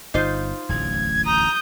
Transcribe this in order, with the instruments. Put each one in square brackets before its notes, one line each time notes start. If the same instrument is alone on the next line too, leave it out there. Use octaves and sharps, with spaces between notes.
[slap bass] G1 [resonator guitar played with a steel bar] D#4 F4 C5
[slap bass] D1 A1 E2 [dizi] G#6
[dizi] A#5 [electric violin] D#6 G6